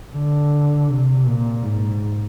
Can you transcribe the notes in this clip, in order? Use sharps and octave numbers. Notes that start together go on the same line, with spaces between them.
D3
C3
A#2
G#2